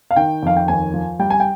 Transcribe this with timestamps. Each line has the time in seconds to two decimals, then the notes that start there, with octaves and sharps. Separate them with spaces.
0.11 F5
0.16 D#3 G5
0.43 F2 F5
0.57 G5
0.68 D#2 G#5
0.94 F3
1.19 G3 G5
1.30 G#5
1.40 G5